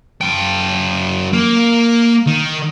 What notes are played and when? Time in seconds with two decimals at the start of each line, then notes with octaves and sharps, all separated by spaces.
0.21 F#2 G5
1.33 A#3
2.26 D#3